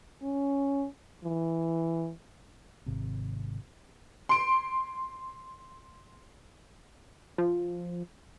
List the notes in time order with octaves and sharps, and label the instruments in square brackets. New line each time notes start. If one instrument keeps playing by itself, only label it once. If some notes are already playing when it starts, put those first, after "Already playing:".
[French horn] C#4
E3
[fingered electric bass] G#1 C3
[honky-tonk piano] C6 D7
[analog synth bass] F3